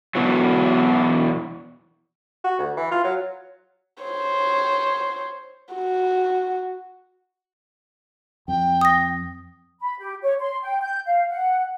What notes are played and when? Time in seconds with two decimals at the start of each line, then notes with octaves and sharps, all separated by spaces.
0.15 E2 B2 E3 F#3
2.44 F#4
2.59 D2
2.77 E3
2.91 F4
3.04 F#3
4.03 C5 C#5
5.74 F#4
8.48 F2 G5
8.81 D#6 A#6
9.80 B5
10.00 G4
10.23 C#5
10.39 C6
10.62 G5
10.82 G6
11.05 F5
11.30 F#5